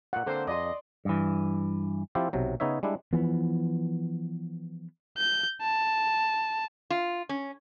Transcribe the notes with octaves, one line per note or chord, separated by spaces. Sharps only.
A#2 F4 F#5
D3 A#3 C4 C5
F2 D5 D#5 G#5 C6
G2 E3
F3 C4 E4 F4 G4
B1 C3 F#3
C#3 B3 D#4 C#5 E5
G3 G#3 D4 E4
E3 F3 B3
G6
A5
F4
C#4